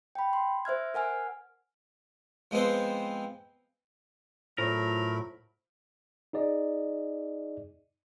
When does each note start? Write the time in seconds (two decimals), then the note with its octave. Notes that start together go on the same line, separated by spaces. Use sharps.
0.15 G5 B5
0.33 C6
0.65 C5 E5 F6 G#6
0.94 A#4 F#5 G#5 F6
2.51 F3 G#3 B3 C4 C5
4.58 A2 F#3 A3 F4 A#4 C5 B5
6.33 D#4 G#4 D5 D#5